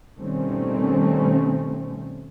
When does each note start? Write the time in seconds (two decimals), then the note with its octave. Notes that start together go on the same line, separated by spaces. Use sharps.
0.18 B2 D#3 G3 A3 C4 C#4